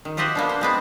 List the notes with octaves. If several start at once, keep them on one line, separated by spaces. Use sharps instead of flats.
D#3
F4 G4 C5 D#5 E5 F#5
A#3 B3 D4
C5
G#3 B3 C4